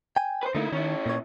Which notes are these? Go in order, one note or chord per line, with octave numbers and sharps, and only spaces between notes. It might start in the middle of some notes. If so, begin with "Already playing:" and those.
G5 G#5
B4 C5
D3 A3 A#3 D#4 E4
D#3 C#4 E4
A#2 C#5